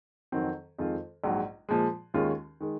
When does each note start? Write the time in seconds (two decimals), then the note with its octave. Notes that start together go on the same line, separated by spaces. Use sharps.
0.32 F2 D#3 F#3 C4
0.78 F2 D#3 G#3 C4 F4
1.24 A#1 G#2 F#3
1.69 A#2 F3 G#3
2.14 D#2 D#3 G#3 C#4 F4
2.61 D#3 G#3